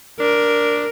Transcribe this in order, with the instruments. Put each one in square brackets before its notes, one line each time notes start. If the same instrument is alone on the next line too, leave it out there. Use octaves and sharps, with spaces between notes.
[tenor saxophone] D4 [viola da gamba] A#4